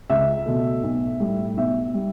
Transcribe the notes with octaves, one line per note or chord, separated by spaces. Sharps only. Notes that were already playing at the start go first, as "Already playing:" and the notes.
C#2 E5
B2 A3
B1
A2 G3
B1 E5
G3